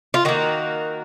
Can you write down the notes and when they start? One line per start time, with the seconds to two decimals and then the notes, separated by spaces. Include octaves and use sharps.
0.14 F4
0.25 D#3 A#3 F#4